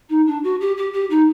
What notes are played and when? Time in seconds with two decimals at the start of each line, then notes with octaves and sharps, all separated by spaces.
0.09 D#4
0.26 D4
0.43 F#4
0.60 G4
0.77 G4
0.93 G4
1.10 D#4